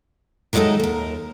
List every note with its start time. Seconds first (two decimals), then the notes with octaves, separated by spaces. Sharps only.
0.53 D#3 F#3 G#3 A3 D#4 A4
0.80 D#2 A#4